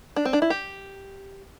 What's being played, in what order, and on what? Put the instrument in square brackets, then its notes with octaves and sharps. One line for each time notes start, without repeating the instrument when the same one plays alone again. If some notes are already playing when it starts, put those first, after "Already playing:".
[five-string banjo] D4
C4
D4
E4
G4